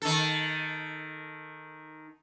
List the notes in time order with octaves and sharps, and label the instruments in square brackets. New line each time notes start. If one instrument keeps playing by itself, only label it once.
[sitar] D#3 A4